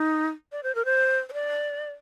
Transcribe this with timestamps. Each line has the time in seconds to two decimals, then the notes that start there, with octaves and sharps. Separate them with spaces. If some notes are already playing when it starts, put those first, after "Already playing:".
Already playing: D#4
0.52 D5
0.63 C5
0.75 A#4
0.85 C5
1.29 C5
1.34 D5